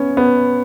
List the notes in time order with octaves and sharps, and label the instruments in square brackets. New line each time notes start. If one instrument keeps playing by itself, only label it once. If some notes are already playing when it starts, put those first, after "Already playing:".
Already playing: [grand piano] B3 C#4
B3